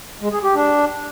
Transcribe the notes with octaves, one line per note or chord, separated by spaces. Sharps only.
G#3
G#4
G4
D4